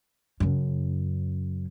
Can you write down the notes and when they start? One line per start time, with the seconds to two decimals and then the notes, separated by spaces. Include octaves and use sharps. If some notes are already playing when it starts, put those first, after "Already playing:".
0.40 F#2 C#3